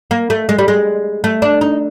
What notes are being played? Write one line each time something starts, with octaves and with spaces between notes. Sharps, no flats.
A#3
A3
G#3
G3
G#3
A3
D4
D#4